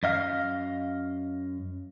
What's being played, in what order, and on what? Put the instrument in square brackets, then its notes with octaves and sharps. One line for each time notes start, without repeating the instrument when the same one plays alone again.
[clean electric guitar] F#2 D#5 F5